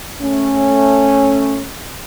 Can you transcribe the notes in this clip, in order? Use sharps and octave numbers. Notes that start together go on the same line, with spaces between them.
A3 C#4